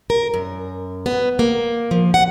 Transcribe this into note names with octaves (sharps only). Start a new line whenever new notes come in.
A#4
F#2
B3
A#3
F3
F#5